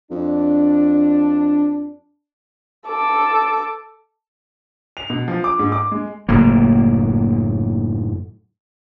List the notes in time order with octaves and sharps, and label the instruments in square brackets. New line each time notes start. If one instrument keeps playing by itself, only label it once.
[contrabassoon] F2 [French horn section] D4
[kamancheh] A4 D6
[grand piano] F7
B2
F3
D6
G#2
D6
G#3
[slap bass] F#1 A2 A#3